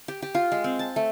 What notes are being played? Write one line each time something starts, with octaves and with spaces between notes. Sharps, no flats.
G4
G4
F4
G#3
C4
A5
A3